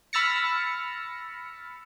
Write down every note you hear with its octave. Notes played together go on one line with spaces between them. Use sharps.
B5 E6 F6 A6 A#6 C#7